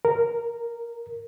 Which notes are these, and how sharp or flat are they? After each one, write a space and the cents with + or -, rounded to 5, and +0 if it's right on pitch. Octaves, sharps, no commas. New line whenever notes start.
A#4 -5